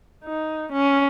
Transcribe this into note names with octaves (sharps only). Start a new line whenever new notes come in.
D#4
C#4